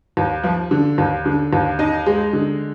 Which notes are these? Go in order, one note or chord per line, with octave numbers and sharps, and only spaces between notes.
D#2
F3
D3
D#2
D3
D#2
D#4
G#3
D3